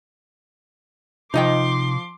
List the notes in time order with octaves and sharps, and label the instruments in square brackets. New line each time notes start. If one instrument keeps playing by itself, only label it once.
[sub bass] C3 [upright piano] F3 [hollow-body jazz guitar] D#4 D#5 G5 [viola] C6 D6